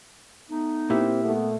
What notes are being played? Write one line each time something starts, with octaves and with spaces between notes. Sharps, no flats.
A3 B3 D#4
A#2 A#3 C4 E4 G4 E5
A3 B3